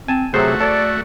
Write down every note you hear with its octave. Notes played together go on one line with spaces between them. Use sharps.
C4 G#5 A5
C3 F#3 A3 F#4 G#4 C5
A4 D5